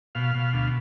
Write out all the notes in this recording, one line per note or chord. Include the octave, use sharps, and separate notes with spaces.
B2 F5
B2
D2